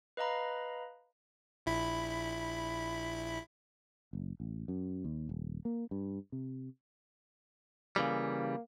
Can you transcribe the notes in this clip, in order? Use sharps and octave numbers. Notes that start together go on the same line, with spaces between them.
B4 D#5 F5 A#5 B5
A#1 E4 B5
F#1
A1
F#2
D#2
D#1
A#3
G2
C3
C#3 E3 G3 A#3